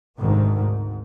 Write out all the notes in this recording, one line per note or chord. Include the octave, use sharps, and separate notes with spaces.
G#1 D2 G#2 C3 D#3
G#2